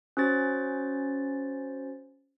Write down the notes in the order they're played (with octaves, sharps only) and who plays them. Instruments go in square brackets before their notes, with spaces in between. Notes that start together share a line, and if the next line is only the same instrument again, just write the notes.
[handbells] C#4 F#4 C5 A6